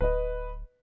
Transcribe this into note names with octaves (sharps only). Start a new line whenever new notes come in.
D1 B4 D#5